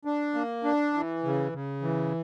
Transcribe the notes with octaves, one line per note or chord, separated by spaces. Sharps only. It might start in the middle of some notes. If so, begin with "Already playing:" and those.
D4
A#3
D4
E3
C#3
C#3
E3